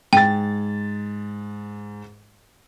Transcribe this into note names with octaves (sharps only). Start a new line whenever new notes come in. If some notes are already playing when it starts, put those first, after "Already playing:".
G#2 G5 A6